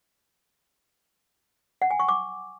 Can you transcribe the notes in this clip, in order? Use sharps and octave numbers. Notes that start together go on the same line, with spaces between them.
F#5
G#5
C#6
D6